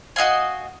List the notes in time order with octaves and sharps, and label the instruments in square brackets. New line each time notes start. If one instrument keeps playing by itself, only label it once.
[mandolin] F#4 D#5 F5 G#5